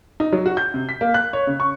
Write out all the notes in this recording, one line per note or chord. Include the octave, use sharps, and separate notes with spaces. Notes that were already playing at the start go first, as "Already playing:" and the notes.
D#4
F#3
F#4
G6
C3
B6
A#3
F#6
C#5
C#3
C#6